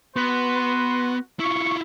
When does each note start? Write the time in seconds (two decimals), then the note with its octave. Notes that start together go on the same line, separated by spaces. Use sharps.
0.16 B3 F#4 B4 C6
1.39 E4 F4 C#6